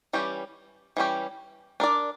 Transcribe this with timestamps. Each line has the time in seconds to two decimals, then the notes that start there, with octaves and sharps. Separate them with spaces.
0.13 E3 G3 C#4 G4
0.97 E3 G3 C#4 G4
1.80 D4 A#4 D5